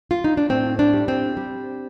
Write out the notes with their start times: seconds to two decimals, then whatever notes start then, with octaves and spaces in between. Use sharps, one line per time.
0.11 F4
0.24 D#4
0.37 D4
0.49 A2 C4
0.79 D4
0.94 G3
1.08 C4
1.37 G3